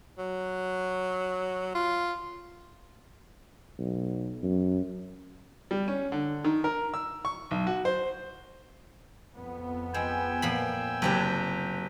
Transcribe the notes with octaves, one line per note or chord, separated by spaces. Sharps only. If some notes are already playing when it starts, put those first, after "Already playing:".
F#3
F4
B1
F#2
G3
C#4
D3
D#3
A#4
E6
C#6
B1
F#4
C5
F2 B3
G#3 G5 G#5 E6
A#2 F3 B5
F#1 C3 D4 G4 B4